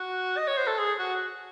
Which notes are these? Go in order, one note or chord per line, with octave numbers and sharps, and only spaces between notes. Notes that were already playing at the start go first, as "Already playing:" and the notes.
Already playing: F#4
D#5
C#5
C5
A4
G#4
F#4